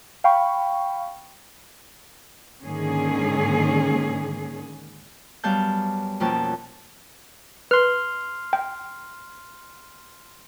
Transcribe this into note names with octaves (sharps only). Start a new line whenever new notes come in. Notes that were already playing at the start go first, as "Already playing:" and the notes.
F5 G5 B5 C#6
G#2 D3 D#3 A#3 C#4 G#4
F#2 G3 B3 F5 A5 G6
F2 B2 A#3 C#4 G5 A5
B4 C6 F6
G5